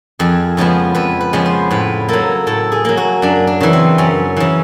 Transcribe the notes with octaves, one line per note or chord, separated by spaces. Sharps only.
F2 G#4
C#3 F3 G#3 B3
F2 B4
B4
C#3 F3 G#3 B3
C5
A2 B4
F#3 A#3 A4
A2 A4
G#4
F#3 A#3
F#4
F#2 D4
D4
C#3 E3
C4
F#2 C#4
C#3 E3